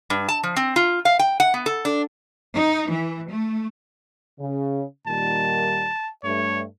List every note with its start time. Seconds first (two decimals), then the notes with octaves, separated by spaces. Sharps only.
0.10 G2
0.29 A5
0.43 F3
0.56 C4
0.76 F4
1.05 F5
1.19 G5
1.40 F#5
1.54 B3
1.66 A4
1.85 D4
2.54 D#4
2.90 E3
3.29 A3
4.39 C#3
5.07 A#2 D#3 G3 A5
6.24 G2 A3 C#5